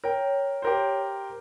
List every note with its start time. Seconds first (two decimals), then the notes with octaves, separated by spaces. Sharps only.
0.04 A#4 C#5 G5
0.62 G4 A#4 C5